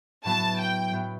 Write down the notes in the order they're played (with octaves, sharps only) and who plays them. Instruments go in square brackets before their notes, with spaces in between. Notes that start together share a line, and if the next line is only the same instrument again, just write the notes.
[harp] A2 F#3 B3 [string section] A5
[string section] G5
[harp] A2 F#3 B3